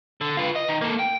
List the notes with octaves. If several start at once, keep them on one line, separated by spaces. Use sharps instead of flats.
D3
F4 B4
D#5
D#3
A#3 A4
G5